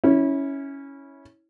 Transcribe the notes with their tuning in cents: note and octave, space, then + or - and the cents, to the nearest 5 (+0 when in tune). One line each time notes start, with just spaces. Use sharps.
C#4 +0 E4 -20